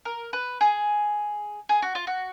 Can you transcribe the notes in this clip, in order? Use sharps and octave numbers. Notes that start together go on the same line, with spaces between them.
A#4
B4
G#4
G#4
F#4
F4
F#4